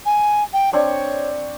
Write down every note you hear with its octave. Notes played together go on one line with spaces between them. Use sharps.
G#5
G5
C4 D4 C#5 C#6